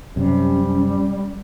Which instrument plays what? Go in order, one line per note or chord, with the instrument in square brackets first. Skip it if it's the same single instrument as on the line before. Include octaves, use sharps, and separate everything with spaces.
[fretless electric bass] F#2 C3 [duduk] G3 [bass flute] C#4